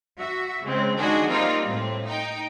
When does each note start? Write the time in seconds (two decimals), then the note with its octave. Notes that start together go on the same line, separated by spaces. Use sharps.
0.18 F#4 E5
0.65 C#3 G#3 C4
0.97 D#3 G#3 D4 F#4 G#4
1.29 G3 A#3 C4 D#4 F4
1.66 A2 C4
2.06 D#4 G5